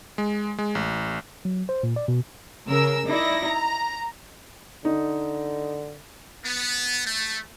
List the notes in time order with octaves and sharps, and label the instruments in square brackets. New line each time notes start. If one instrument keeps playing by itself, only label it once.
[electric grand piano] G#3
G#3
A1
[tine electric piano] F#3
C5
A#2
D5
B2
[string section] C#3 A#4 E6
D#4 E4 D5 A#6
A#5
[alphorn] D3 [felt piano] D#4
[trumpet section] B3
A3